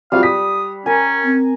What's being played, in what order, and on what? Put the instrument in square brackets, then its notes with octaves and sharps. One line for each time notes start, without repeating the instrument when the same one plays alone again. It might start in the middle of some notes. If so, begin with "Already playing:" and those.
[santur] G3 [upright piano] C4 F4 F#4 [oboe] F5
[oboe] D#6 [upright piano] B6
[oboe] C#4 [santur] A#4 G#5
[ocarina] C4